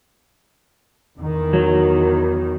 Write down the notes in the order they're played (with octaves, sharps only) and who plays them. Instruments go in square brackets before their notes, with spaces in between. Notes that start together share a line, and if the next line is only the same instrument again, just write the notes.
[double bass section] E2 D#3
[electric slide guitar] F#3